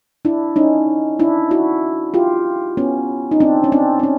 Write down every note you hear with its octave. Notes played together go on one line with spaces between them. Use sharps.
D4 E4
C#4 D#4
D4 E4
E4 F#4
F4 G4
B3 C#4
D#4
C4 D4
C#4
C4 D4
C4
C#4